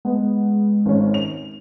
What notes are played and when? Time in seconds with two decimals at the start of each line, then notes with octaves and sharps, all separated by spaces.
0.05 G#3 B3
0.86 G#1 C#4
1.14 F7